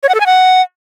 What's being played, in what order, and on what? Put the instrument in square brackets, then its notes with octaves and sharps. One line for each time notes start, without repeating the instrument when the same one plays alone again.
[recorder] C#5
F#5
A4
G#5
F#5